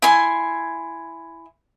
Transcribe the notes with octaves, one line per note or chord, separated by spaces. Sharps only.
E4 G#5 C6